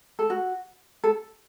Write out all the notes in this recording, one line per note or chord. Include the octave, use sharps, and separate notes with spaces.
A4
F#4
A4